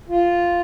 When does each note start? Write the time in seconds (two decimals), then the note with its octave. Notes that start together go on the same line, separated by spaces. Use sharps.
0.09 F4